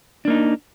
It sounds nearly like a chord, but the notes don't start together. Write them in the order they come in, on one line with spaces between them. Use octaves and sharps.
D4 A#3 D#4